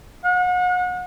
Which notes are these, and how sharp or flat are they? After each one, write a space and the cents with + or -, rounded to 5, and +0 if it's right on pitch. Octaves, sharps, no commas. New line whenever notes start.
F#5 -35